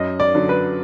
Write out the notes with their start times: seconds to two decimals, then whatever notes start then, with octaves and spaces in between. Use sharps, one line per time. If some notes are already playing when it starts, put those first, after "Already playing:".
Already playing: F#2 D#5
0.20 D5
0.34 D3 F#3
0.49 B4